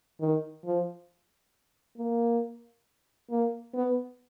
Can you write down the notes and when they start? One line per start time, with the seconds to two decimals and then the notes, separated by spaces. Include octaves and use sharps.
0.20 D#3
0.64 F3
1.98 A#3
3.30 A#3
3.74 B3